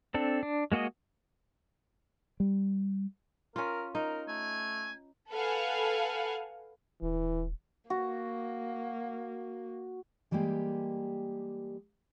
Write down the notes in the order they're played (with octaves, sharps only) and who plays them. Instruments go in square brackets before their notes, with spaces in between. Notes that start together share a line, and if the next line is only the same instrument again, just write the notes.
[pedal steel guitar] C4 D4 A4
D4
G#3 A#3 F#4 G#4 D#5
[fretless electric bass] G3
[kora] C#4 F4 [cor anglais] A#4
[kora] D#4 [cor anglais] A#4
[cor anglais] A3 [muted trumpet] G#5
[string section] A4 B4 F5 F#5 G#5
[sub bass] D#1 [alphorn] E3
[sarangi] A#3 [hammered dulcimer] F#4
[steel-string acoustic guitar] E3 G3 G#3 A#3 G4